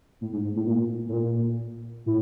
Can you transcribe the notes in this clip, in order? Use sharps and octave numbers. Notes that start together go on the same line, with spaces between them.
A2
G#2
G#2
A2
A#2
A2
A#2
A2